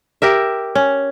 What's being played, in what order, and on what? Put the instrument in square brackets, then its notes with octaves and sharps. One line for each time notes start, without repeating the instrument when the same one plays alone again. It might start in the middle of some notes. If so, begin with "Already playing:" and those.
[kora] G4 A#4 E5
C#4